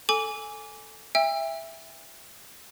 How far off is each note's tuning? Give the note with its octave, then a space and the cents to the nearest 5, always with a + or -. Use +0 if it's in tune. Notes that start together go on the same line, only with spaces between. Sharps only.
A4 +0 G#5 +0 D6 -20
E5 +0 G5 +45 E6 +15